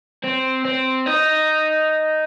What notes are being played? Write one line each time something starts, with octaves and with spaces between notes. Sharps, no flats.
C4
C4
D#4